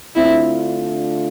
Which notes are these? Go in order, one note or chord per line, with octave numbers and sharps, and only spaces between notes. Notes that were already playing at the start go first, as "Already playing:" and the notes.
D3 A3 C4 D4 E4 F4